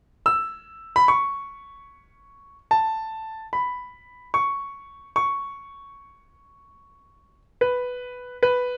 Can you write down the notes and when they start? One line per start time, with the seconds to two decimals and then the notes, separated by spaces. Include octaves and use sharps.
0.26 E6
0.96 B5
1.08 C#6
2.71 A5
3.53 B5
4.34 C#6
5.16 C#6
7.61 B4
8.43 B4